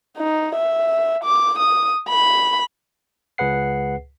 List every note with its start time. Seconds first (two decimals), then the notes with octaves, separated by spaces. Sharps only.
0.17 D#4
0.55 E5
1.24 D6
1.59 D#6
2.09 B5
3.38 C#2 G#4 B4 F#5 C7